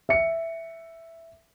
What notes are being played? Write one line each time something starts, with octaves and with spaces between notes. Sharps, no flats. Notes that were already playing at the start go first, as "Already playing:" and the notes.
E5 C#7